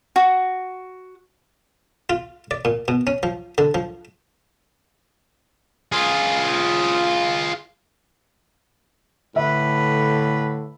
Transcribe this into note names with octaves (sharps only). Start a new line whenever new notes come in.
F#4
F4
D5
A#2
B2
C#4
F3
D3
F3
F4 G#4
A2 D3 B4 E5